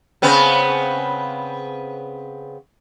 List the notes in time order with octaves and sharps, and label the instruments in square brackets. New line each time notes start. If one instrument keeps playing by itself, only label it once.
[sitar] C#3 B3 C4